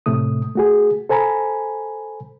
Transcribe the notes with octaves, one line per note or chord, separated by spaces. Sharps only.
A2 C3 A3 D#6
A3 F#4 G#4
A4 C5 G#5 A#5 B5